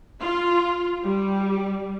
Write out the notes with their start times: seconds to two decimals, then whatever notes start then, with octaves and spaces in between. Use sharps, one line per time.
0.22 F4
1.03 G3